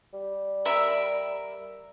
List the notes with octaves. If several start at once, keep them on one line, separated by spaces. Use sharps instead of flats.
G3
A#4 E5 B5